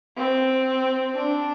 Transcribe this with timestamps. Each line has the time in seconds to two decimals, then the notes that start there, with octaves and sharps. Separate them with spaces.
0.17 C4
1.15 D4